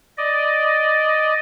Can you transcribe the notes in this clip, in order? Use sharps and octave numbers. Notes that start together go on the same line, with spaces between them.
D5 D#5